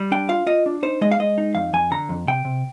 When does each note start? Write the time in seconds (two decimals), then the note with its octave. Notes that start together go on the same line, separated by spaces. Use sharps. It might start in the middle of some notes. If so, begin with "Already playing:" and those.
Already playing: G3
0.12 D4 G5
0.29 F4 F5
0.47 F4 D#5
0.66 D4
0.83 D#4 C5
1.01 G#3 D#5
1.11 F5
1.20 G#3 D#5
1.38 D#4
1.55 F2 F5
1.73 F2 G#5
1.91 D3 A#5
2.09 F2
2.27 C3 G5
2.45 C3